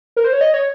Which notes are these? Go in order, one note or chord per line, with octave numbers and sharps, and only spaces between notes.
A#4
C5
C#5
D#5
C#5